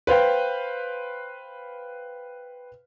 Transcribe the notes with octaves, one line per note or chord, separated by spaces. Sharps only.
B4 C5 F5 G5